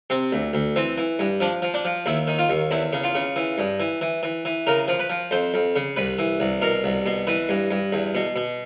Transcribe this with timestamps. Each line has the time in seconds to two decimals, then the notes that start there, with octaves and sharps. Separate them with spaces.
0.10 C3 C4
0.32 D2
0.53 D2
0.76 E3 C4
0.98 E3
1.19 G2
1.41 F3 D4
1.62 F3
1.74 D4
1.85 F3
2.06 D#2 E4
2.27 D#3
2.38 F4
2.49 D#2
2.71 E2 E4
2.93 C#3
3.04 F4
3.15 C#3
3.36 E3
3.58 G2
3.80 E3
4.01 E3
4.23 E3
4.45 E3
4.67 C#3 A#4
4.88 F3
5.00 B4
5.10 F3
5.31 F2 C5
5.54 F2
5.76 C#3
5.96 C2 B4
6.19 E3
6.40 C2
6.62 B2 A#4
6.84 C2
7.06 B2
7.27 E3 B4
7.49 G2
7.71 G2
7.92 E2
8.15 B2
8.36 B2